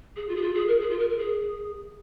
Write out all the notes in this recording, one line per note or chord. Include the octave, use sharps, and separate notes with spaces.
G#4
F4
G#4
F4
G#4
A#4
G#4
F4
A#4
A#4
G#4